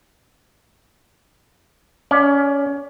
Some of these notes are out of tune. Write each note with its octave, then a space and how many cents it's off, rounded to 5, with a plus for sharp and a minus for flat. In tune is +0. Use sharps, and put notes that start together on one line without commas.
C#4 +20 D5 +0